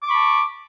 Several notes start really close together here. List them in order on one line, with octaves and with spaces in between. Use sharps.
D6 C#6 B5 A5